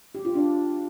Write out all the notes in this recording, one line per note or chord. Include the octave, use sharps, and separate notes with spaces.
G4
F4
D4